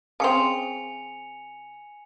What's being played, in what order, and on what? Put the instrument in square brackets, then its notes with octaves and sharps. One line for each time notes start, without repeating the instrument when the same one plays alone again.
[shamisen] C#3 C4 [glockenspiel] G#5 C#7 F7